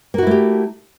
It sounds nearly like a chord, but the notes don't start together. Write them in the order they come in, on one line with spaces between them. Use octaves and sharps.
A#3 F#4 E4 A3 G4